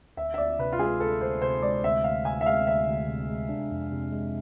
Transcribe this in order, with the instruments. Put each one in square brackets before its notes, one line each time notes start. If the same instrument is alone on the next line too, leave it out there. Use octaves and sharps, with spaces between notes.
[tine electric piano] D2 [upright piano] E5
[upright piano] E5
[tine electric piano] D2 [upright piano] D5
[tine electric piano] C3 [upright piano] B4
[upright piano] F4
[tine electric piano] G#3 [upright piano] G#4
[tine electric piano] D2 [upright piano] A4
[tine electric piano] D2 [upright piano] C5
[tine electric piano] C3 [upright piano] C5
[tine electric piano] G#3 [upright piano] D5
[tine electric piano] D2 [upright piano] E5
[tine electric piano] D2 [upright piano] F5
[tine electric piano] C3 [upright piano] G#5
[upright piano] E5
[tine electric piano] G#3 [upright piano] F5
[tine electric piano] D2 [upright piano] E5
[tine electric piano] D2
C3
G#3
D4
F2
C3
G#3